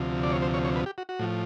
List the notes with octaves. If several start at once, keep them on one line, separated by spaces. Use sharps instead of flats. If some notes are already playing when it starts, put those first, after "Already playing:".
Already playing: D2 C3 F3
D5
C#5
C5
C#5
C#5
B4
G4
F#4
F#4
A2 F3